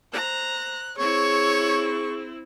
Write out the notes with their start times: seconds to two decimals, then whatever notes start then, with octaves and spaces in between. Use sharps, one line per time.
0.13 C5 A#5 F#6
0.98 C4 E4 G#4 C#5 C#6